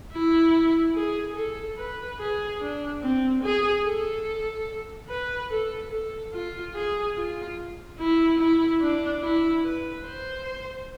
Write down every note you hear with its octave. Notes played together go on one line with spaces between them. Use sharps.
E4
G#4
A4
B4
G#4
D4
C4
G#4
A4
B4
A4
A4
F4
G#4
F4
E4
E4
D4
E4
B4
C5